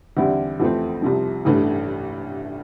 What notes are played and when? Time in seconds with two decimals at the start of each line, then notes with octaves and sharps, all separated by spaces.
0.17 E2 D3 G3 C4 E4
0.60 F2 E3 A3 C4
1.02 C2 C3 F3
1.45 A1 G2 E3 A3